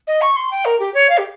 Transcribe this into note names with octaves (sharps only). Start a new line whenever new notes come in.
D#5
C#6
C6
G5
A#4
G4
C#5
F5
G4